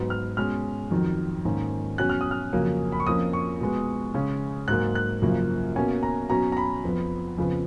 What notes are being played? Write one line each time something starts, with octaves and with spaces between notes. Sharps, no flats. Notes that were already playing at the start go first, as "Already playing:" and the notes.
Already playing: G#2 F#3 B3
F6
B2 G#3 C#4 F6
F2 D#3 F#3
G#2 D#3 A#3 C#4
B2 F#3 C#4 F#6
F6
D#6
F6
F2 C#3 F#3 A#3 C#4
B5
C#6
F2 F3 A#3 C#4 D#6
C#6
B2 G#3 B3
C#3 G#3 C#4
G#2 F#3 A#3 F#6
F#6
F#2 C#3 F3 A#3
B2 A#3 C#4 G#5
A#5
B2 F#3 C#4 A#5
A#5
B5
F2 F3 B3
F2 C#3 F3 B3